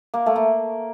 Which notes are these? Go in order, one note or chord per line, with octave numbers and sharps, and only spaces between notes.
A#3
A3
A#3